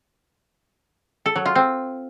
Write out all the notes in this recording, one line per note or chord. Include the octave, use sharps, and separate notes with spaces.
A4
F#3
F4
C4